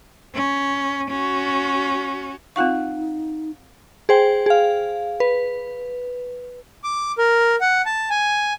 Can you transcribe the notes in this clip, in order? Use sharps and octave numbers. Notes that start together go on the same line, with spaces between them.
C#4
C#4 F#4
C4 D#4 F4 F5 F#5 C#6 F#6
G#4 C5 G5
G#4 F5
B4
D6
A#4
F#5
A5
G#5